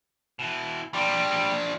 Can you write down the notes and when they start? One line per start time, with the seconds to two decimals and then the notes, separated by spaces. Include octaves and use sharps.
0.39 B2 E3
0.94 F3 G3 D4